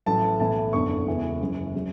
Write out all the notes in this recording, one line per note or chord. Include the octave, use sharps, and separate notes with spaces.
A1 A2 F#3 A5
B1 A2 E3 A5
F#1 E2 D3 C#6
E1 E2 C#3 E3
F#1 F#2 C#3 E3
C#3 F#3